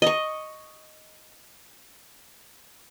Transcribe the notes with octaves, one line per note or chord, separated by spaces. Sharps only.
D#5 C#6